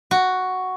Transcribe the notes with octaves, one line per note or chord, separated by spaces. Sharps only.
F#4